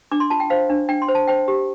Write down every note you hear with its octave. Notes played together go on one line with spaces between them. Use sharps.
D4 D6
C6
F4 A5
G5
C5 F5
D4
D4 G5
C6
C5
A5
C5 G5
G4